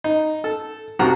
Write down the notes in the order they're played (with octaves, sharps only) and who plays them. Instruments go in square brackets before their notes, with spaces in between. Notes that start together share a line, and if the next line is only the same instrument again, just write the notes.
[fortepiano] D#4
A4
C2 F2 F#4 G4 F#5 A#5